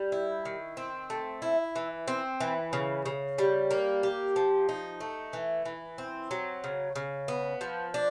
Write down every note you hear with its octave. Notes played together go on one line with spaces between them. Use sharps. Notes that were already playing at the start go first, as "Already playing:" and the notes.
Already playing: G3
E4
D#3
C4
A3
E4
E3
C4
E3
C#3
C#3
G3
A#3
G4
F3
D#4
A3
E3
E3
C4
F#3
C#3
C#3
B3
F3
D4